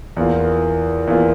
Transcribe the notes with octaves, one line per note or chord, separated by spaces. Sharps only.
E2 E3 A#3 F4
E2 E3 A#3 F4